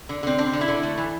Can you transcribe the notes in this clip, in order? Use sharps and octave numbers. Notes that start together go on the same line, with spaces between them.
D3
D3 C4
C4 D4
D3
E4
D3
A3
E3